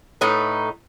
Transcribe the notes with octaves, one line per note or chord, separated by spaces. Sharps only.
A2 D#4 B4